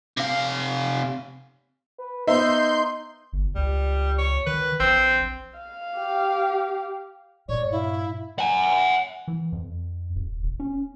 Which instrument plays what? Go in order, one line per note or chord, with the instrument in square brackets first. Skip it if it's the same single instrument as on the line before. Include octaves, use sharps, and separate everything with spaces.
[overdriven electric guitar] C3 F5
[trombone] B4
[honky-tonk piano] B3 C5 E5 [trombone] D#4 [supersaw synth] C6 G6
[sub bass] G1
[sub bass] C#2 [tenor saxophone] G3
[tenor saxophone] C#5
[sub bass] D#3 [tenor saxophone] B4
[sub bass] A#1 [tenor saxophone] C4
[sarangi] F5
[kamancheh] G4
[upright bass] G2 A#2 [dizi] C#5 [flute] D5
[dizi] E4 [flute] F5
[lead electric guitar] F#5 G#5
[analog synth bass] E3
F2
D#1
E1
C#4